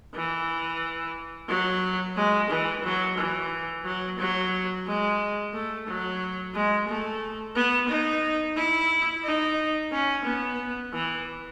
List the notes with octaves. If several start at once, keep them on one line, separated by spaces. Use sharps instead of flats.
E3
F#3
G#3
E3
F#3
E3
F#3
F#3
G#3
A3
F#3
G#3
A3
B3
D#4
E4
D#4
C#4
B3
E3